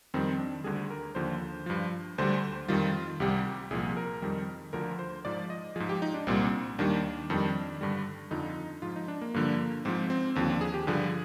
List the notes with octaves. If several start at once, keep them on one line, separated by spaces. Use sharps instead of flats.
F2 D#3 G3 C4
D4
D2 D3 G3 G#4
A#4
D#2 D3 F3 C5
G2 F3
D2 D3 G3 C5
F2 D#3 G3 F4
C2 C3 G3 G4
C2 A#2 F3 G#4
A#4
F2 D#3 G3
D2 D3 F3 A#4
C5
G#2 F3 D5
D#5
G#2 F3 G#4
G4
D#4
D4
C2 A#2 G3 C4
D#2 D#3 G3 D4
F2 D#3 G3
G2 D3 G3
F2 D3 F3 D#4
G#2 F3 F4
D#4
D4
A#3
G2 D3 F3 A#3
G#2 F3 C4
C4
D#2 D3 F3 C4
D4
G#4
G4
G2 D3 F3 G#4